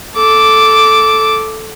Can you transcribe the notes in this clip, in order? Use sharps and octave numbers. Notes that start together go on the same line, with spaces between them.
A4 D6